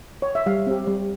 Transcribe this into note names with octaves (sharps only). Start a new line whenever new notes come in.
C#5
E5
G3 F5
C4 G4
G3